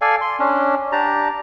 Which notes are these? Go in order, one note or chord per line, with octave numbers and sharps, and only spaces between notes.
A4 D5 F5 G#5
C6
C#4 D4
D4 G4 A5 A#5